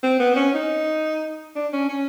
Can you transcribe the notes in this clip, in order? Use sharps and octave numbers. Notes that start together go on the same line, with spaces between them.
C4
B3
C4
C#4
D#4
D4
C#4
C#4